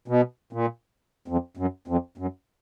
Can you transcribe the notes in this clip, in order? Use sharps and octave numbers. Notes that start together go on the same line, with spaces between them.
B2
A#2
F2
F#2
F2
F#2